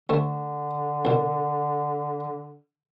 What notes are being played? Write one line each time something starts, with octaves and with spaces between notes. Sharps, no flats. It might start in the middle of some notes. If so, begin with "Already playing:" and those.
D2 D3 A3
C2 B2